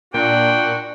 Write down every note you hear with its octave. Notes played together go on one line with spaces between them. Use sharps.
A#2 D4 F#4 G5